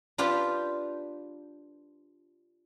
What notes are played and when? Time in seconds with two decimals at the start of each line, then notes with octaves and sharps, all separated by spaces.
0.18 D4 F4 G4 B4 C5